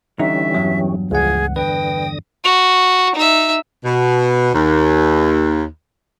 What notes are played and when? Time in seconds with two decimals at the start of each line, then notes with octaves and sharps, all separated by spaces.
0.19 D3 E3 G3 C#4 D#4 E5
0.54 E2 G2 F#3
1.11 C#2 F3 G#4 F#5
1.56 D3 B4 G5 D#6 A#6
2.44 F#4
3.15 D#4 E5
3.85 B2
4.53 D#2